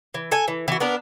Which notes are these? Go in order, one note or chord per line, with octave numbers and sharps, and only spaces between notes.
E3
A4 G#5
E3
E3 F#4
B3 D4 A#4